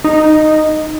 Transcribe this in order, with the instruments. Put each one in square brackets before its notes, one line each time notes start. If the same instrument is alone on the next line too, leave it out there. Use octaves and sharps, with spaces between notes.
[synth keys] D#4